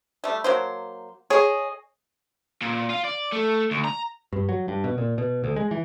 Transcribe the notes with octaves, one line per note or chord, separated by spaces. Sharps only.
G3 A3
F#3 A#3 C5
G#4 C#5 D#5
A#2
F4
D5
A3
D2
A#5
G2
F#3
G2
B2
A#2
B2
D2
G#3
E3